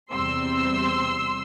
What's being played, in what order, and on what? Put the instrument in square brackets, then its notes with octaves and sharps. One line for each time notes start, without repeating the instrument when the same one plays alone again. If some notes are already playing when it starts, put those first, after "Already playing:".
[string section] E2 C3 G3 C4 C6 E6